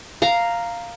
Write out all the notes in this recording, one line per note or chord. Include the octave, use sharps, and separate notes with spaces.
F5 A#5